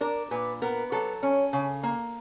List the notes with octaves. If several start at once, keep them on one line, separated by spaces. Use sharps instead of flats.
D4 A#4
A#2 B4
B3 A#4
F#3 A4
C#4
C#3
A#3